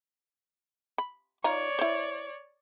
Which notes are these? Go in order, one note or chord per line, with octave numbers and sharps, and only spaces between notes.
B5
D#3 F4 C#5 D5 A#5
E4 C5